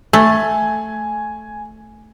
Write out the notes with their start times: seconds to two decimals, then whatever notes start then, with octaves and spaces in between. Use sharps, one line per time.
0.13 A3 G#5